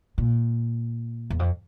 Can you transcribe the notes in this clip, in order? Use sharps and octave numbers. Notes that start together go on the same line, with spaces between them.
A#2
E2
F2